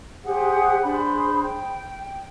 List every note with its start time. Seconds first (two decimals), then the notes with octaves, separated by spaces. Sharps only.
0.24 G4 G#4 C5 F#5
0.83 D4 G#4 C5 B5
1.42 G5